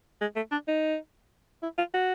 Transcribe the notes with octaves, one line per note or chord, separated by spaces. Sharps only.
G#3
A3
D4
D#4
E4
F4
F#4